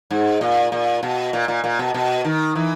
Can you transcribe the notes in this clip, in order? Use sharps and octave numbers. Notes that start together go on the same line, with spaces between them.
G#2
A#2
A#2
B2
A#2
A#2
A#2
B2
B2
D#3
E3